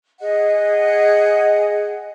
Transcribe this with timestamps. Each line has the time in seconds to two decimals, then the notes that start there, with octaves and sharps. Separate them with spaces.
0.19 G#4 D#5 F#5